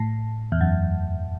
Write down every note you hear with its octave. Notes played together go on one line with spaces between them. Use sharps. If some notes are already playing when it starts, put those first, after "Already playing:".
Already playing: A2
E2
F#2